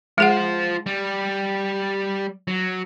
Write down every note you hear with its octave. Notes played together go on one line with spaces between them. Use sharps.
G#3 F4 G#4 C5 F#5
G3
F#3